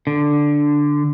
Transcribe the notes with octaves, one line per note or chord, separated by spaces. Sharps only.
D3